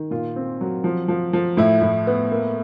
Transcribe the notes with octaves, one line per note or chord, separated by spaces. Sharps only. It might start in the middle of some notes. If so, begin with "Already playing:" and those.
Already playing: D#3
A#2 F4
C4
F#3
F3
F3
F3
A2 E4
A2
B3
A#3